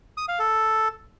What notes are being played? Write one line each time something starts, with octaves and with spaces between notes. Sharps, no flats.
D#6
F5
A4